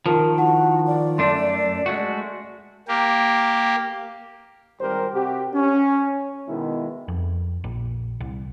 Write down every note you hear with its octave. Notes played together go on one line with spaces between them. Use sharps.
D#3 F3 A#4 A5
E4 F#4 F#5 A5
D5
F#2 A3 D4 C6
G#3 A3 F#4
A#3 G4
G#1 G3 G4 A#4 C5
C3 F#4 G4
C#4
B2 D#3 G#3 B3 E4
F2
A#1
C2